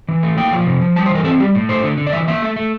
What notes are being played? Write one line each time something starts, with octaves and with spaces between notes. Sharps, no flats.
E3
A3
A#3 G5
F3
C3
F3
G3 A5
C5
E3
A#4
C4 A4
G3 G4
A2
A3 C5
D3
D3
D5
E3 E5
A#3 E5
A3
A3